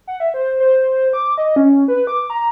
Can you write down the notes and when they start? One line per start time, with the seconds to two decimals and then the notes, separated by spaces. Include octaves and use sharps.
0.07 F#5
0.20 E5
0.34 C5
0.60 C5
1.13 D6
1.38 D#5
1.56 C#4
1.88 B4
2.07 D6
2.30 A#5